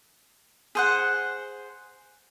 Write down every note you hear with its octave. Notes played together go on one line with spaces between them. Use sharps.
G#4 C5 F#5